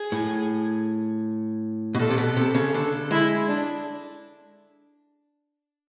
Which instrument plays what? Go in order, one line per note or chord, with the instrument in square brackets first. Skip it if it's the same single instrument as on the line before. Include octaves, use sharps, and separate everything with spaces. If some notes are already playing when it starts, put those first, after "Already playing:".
Already playing: [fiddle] G#4
[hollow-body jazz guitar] A2
B2
[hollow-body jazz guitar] A#2 [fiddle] A4
[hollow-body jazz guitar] C3
B2
[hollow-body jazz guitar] C3 [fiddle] A4
[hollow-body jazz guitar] C#3
[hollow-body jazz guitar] D3 [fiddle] A4
[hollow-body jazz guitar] G#3 [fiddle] E4
[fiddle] D4